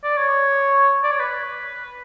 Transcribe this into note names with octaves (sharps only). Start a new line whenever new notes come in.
D5
C#5
D5
C#5
B4